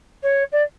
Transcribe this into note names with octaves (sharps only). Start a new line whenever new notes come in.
C#5
D5